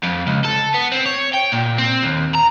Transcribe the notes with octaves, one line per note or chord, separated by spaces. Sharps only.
F2
C#2
A4
B3
C4
C#5
G5
A#2
C4
D#2
A#5